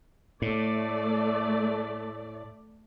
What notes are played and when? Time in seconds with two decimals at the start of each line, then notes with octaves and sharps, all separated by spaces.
0.42 A2 A3 D5